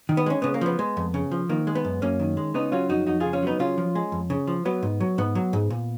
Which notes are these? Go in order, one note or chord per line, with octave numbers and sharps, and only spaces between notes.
D#3
B3
G#3 C#4
C#3 B3
A#3
F3 B3
G#3
F2
C#3
F3
D#3 A#3
G#3
B3
F#2
F#2 A#3 C#4
D#3
G#3
C#3 B3 D#4
F#3 C#4 F4
F2 D#4 F#4
F2 D#4 F#4
C#3 F4 G#4
C#4 F4
F#3 B3 D#4
C#3 C#4 F4
F3
G#3
F2
C#3
F3
F#3 B3
G#2
F#3
G#2 B3
F#3
G#2
A#2